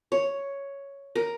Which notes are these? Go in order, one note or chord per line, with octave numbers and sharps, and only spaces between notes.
C#5
A#4